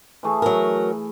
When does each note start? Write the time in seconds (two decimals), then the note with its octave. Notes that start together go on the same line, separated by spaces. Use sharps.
0.23 E3 A3 G#4
0.42 F#3 A#4